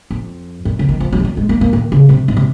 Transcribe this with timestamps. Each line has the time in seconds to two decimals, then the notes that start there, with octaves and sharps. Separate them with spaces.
0.11 F2
0.65 F#2
0.79 C#3
0.89 D#3
1.00 F3
1.13 F#3
1.20 G#3
1.25 F#3
1.37 G#3
1.49 A#3
1.61 A#3
1.73 D#3
1.92 C#3
2.09 C3
2.28 G#2
2.37 C3